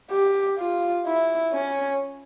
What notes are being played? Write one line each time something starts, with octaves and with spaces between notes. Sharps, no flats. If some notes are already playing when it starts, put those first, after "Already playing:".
G4
F4
E4
C#4